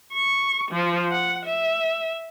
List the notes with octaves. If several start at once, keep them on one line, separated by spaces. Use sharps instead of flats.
C#6
F3
F#5
E5